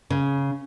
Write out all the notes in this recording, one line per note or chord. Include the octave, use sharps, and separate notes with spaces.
C#3